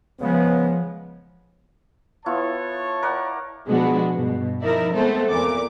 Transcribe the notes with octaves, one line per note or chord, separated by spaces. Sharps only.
C#3 F3 G#3 B3
B3 E4 F4 C#5 A5
A#4 D5 F#5
B2 F3 G#3 B3 D4 F#4
G2 B2
F3 D#4 E4 A#4 D5 E5
G#3 A3 B3 C4 A4 C5
E2 A#2 D6